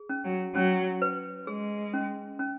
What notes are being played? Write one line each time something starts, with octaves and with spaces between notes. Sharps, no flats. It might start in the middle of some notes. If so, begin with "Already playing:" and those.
Already playing: G#4
C#4
F#3
F#3 C#4
B4
G#3 G#4
C#4
C#4